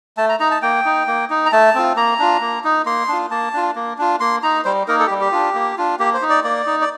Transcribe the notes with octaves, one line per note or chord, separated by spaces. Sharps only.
A3 A5
A#5
D#4 A#5
A5
A#3 G5
D#4
A#3
D#4
A#5
A3 A5
C4 F4
A#3 A#5
D4 F4
A#3
D#4
A#3 C6
D4 F4
A#3 A5
D4 F4
A#3
D4 F4
A#3 C6
D#4 A#5
G3 C5
A#3 D#4 A#4
A4
G4
G3
G4
D4 F4
A#3
D4 F4
A#3 G4
C5
D#4
D5
A#3 D5
D#4
D5